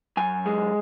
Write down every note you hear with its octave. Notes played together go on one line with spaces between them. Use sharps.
F#2 G#5
G#3